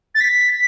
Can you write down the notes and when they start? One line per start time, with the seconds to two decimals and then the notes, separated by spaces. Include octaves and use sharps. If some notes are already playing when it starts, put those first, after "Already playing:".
0.15 A6
0.21 B6